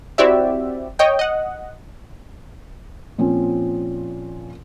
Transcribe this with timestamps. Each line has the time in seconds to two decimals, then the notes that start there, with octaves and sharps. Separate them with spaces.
0.18 C4 E4 F#4 G4 D5 E5
0.99 C#5 D#5 G5
1.19 D#5 F#5
3.18 A#2 F3 C4 C#4